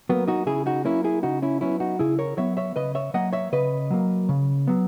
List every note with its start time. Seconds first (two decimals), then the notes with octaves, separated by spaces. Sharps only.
0.09 F#3 A#3 B3
0.28 D#4 F#4
0.46 C#3 E4 G#4
0.66 D#4 F#4
0.85 F#3 A#3 C#4 E4
1.04 E4 G#4
1.23 C#3 D#4 F#4
1.42 C#4 E4
1.61 F#3 B3 C#4 E4
1.80 D#4 F#4
1.99 C#3 E4 G#4
2.19 A#4 C#5
2.38 F#3 B3 C#5 E5
2.57 C#5 E5
2.76 C#3 B4 D#5
2.95 C#5 E5
3.14 F#3 A#3 D#5 F#5
3.33 C#5 E5
3.52 C#3 B4 D#5
3.91 F#3 A#3
4.29 C#3
4.67 F#3 B3